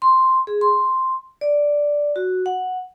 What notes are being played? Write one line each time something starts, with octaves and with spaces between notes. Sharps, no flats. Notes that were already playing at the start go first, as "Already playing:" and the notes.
C6
G#4
C6
D5
F#4
F#5